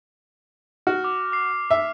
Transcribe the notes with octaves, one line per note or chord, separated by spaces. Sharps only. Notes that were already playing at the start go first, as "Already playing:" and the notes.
F#4 F6
D6
D6 C7
E5